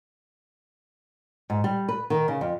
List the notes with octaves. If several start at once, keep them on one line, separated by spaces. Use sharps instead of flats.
G#2
G3
B4
D#3
C#3
F2